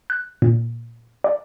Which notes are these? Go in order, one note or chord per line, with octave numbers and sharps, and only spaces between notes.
F#6
A#2
D5